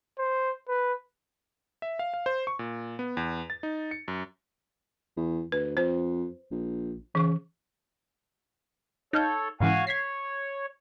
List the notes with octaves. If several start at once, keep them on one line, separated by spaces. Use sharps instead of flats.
C5
B4
E5
F5
F5
C5
C#6
A#2
B3
E2
A6
D#4
C#7
F#2
E2
D2 B4
F2 C5
A#1
C#3 E3 C#6
D#4 A4 C#5 F5 G6
G#2 C#3 E3 F#4 F5 G#5
C#5 G#6 B6 C7